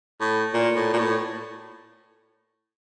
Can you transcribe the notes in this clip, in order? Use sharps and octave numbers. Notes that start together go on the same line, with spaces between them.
A2
A#2
A2
A#2
A2